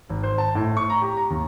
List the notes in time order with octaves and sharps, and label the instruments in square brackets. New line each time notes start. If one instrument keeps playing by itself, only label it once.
[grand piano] G#1
C5
A5
A2
C#6
A#5
G4
A#5
D#2